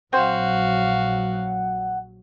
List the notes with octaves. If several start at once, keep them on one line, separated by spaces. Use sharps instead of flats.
A#1 F#3 C4 F#4 C5 F5 F#5